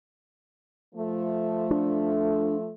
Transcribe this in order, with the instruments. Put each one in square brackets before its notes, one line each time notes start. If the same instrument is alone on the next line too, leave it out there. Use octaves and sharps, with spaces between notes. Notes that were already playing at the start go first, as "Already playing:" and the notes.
[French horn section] F3 A3
[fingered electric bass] D4